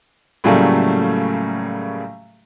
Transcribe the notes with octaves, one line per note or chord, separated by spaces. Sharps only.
A2 C#3 F#3 G3 A3 A#3